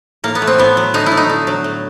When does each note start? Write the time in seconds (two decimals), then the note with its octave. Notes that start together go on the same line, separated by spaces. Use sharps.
0.24 A2 A#3
0.35 B3
0.42 A3
0.47 C4
0.58 A2 B3
0.77 F#3
0.94 D3 D#4
1.06 E4
1.12 A3
1.17 D#4
1.29 D3
1.47 F#3
1.64 A2